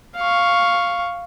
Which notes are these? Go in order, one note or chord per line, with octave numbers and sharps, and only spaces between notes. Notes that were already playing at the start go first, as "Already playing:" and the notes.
F5 C#6